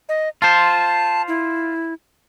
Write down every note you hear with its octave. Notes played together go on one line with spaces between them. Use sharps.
D#5
F4 C5 A5
E4